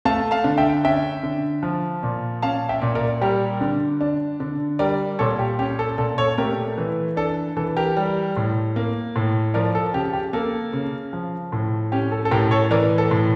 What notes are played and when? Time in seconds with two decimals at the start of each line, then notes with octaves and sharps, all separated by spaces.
0.05 A3 F5 A5
0.31 F5 A5
0.44 D3
0.58 E5 G5
0.84 C#4 E5 G5
1.23 D3
1.63 F3
2.03 A#2
2.42 C#4 F5 A5
2.69 E5 G5
2.82 A#2
2.95 A#4 D5
3.21 G3 G4 A#4
3.61 D3
4.01 D4
4.40 D3
4.79 G3 A#4 D5
5.19 A#2 A4 C#5
5.39 G4
5.59 C#4 G4
5.79 A4
5.98 A#2 A4
6.18 A4 C#5
6.38 A3 G4 A#4
6.78 E3
7.17 D4 A4
7.57 E3 A4
7.77 G4 A#4
7.97 G3
8.37 A2
8.76 A#3
9.16 A2
9.54 F3 A#4 D5
9.75 A4
9.94 C#3 G4
10.13 G4
10.33 A#3 A4
10.73 C#3
11.13 F3
11.52 A2
11.92 C#4 G4
12.11 A4
12.25 A4
12.31 A2 G4 A#4
12.51 A4 C#5
12.71 E3 A#4 D5
12.98 A4
13.11 A2